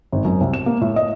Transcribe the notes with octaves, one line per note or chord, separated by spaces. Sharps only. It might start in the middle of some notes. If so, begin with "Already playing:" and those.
G#1
F#2
C2
E7
A#3
A2
D#5